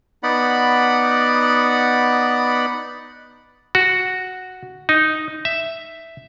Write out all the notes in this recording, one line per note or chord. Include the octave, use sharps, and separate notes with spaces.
B3 D#4 D5 F#5 B5
F#4
D#4
E5